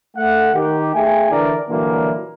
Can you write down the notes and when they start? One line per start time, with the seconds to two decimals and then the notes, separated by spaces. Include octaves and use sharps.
0.17 A3 F#5
0.54 D#3 G4
0.94 A3 G#4 E5 G5 G#5
1.30 D3 E3 A#4 D5
1.69 A#2 D3 E3 F#3 G3 A#3